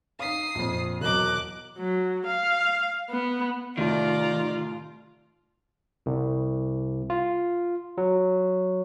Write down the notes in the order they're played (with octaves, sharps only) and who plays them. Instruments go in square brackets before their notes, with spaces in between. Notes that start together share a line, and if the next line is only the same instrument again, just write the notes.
[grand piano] D#4 F5 [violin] D#6 C7
[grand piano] A#1 F2
[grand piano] E1 F#3 D#5 [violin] D6 F#6
[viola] F#3
F5
B3
[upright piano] C2 A2 [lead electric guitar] D#3 [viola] F4 [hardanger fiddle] D5 A#5
[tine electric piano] C2
F4
F#3